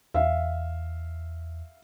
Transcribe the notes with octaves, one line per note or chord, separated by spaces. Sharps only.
E2 E5 F5